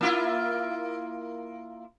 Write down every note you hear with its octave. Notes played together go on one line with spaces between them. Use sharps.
A#3 E4 F4